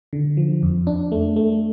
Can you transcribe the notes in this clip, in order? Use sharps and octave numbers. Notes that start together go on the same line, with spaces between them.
D3
F3
F2
D4
A3
A3